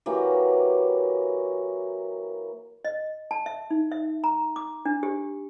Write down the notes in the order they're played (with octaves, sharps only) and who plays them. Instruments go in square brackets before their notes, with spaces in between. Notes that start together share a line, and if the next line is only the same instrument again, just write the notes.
[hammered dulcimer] E3 F#3 A#3 G4
[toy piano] D#5
A5
E5
D#4
E5
A#5
D6
D4
G4